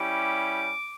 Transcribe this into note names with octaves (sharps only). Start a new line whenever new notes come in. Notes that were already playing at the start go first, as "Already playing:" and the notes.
Already playing: G3 C#4 E4 G4 D6